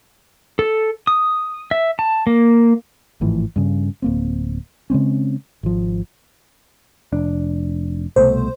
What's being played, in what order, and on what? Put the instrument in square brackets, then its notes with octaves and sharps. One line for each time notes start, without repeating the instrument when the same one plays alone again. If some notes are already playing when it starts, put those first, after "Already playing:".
[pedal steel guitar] A4
D#6
E5
A5
A#3
[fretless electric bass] G#1 A2 E3 F3
G2 C#3
D1 A#3 C4
C#3 G#3 C4 C#4
G#1 F3
[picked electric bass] F1 D4
[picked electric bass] C2 B2 A3 [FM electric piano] C5